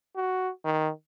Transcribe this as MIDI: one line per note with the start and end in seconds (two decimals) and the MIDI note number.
0.16 0.49 66
0.65 0.90 51